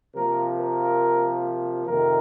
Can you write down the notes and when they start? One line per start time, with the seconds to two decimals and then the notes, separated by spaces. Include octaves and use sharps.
0.15 C3 F3 A#3 A#4
0.58 A#4
1.87 F2 C3 D#3 A#4